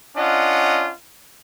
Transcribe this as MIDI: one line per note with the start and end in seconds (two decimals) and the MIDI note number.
0.17 0.92 61
0.17 0.92 62
0.17 0.92 65
0.17 0.92 75
0.17 0.92 78